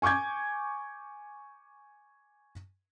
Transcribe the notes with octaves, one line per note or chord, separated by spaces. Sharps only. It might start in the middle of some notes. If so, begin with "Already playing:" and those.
G#5 C#6 D6 G6 G#6